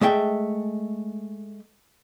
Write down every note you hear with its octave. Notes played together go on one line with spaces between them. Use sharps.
G#3 A3 E5 G5